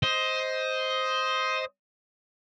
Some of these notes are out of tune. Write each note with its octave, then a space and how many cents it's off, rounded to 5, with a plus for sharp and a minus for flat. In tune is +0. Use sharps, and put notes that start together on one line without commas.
C5 +0 D#5 +15